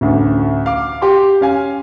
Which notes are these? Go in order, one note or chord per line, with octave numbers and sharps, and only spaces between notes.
A1 D2
F5 D6
G4 C6
C#4 F5 G#5